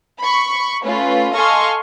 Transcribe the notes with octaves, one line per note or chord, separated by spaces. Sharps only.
B5 C#6
A3 C#4 F4 B4
A4 D#5 F5 G#5 C6 C#6